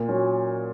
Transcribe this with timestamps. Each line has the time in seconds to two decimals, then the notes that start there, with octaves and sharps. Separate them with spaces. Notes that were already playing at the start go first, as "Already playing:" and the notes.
Already playing: A#2
0.09 F#3 C#4